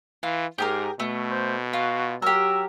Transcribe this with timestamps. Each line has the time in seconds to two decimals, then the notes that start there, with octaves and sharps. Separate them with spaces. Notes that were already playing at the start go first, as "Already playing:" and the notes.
0.23 E3 F4
0.58 G#2 G4 G#4 A#4
1.00 B2 A3
1.31 C5
1.73 F4 F#4
2.22 F#3 G4 A#4 E6